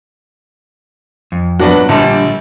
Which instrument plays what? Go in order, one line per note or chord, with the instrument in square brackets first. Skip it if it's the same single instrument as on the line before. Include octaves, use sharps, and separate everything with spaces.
[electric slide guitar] F2
[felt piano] G2 A#2 F#3 [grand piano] B3 D4 F#4
[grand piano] A#1 A5 [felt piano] A#2 [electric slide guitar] D3 G3